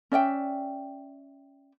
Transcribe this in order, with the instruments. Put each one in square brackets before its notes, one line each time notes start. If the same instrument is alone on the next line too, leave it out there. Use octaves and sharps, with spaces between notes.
[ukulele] C#4 D5 E5 G5